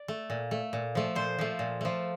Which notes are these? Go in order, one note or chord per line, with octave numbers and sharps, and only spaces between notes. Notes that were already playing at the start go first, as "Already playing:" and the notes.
Already playing: D5
A3
A#2
A3
A#2
F3 A3
A#2 C5
F3 A3
A#2
F3 A3